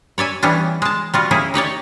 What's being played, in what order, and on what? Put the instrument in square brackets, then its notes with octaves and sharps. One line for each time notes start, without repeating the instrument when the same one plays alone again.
[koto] C#5 D5 E5 G#5
E3 G3 B3 C#4 D4
G#3 A5
G3 F4 F#4
A#3 C#4 E4 G#4
D#4 G4 C#5 D5